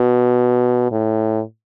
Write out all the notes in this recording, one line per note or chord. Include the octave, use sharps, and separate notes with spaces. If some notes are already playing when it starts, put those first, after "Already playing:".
Already playing: B2
A2